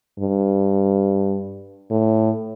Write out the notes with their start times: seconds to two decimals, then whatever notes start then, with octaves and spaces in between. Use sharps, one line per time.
0.19 G2
1.91 A2